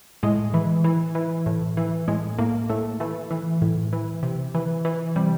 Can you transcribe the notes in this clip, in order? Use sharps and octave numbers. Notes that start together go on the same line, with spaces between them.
A2 G#3
E3
E3
E3
A2
E3
A2 G#3
A2 A#3
A2 A3
E3 A3
E3
A2
E3
C3
E3
E3
C3 G3